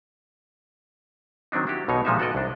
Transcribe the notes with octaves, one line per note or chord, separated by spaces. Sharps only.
D#3 F#3 C4 D4 D#4
D4 E4 F#4 G4
B1 B2 D#4 C#5
A#2 F3 G#3 D#4 A#4 E5
B3 F#4 A4 D5 D#5
C2 D4